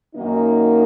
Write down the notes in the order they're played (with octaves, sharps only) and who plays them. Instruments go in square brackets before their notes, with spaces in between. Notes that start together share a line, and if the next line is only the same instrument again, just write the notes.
[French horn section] F#2 D#3 A#3 D#4